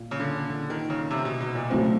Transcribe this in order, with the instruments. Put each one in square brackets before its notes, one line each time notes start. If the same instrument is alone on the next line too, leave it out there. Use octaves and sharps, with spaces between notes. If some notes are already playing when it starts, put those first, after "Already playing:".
Already playing: [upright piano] A#2
[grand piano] C#3
D3
D3
D#3
C#3
C3
B2
B2
A#2
[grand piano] A2 [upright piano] C#3 F#3 A3 C4